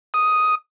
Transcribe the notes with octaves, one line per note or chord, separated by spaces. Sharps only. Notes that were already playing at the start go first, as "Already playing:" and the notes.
D#6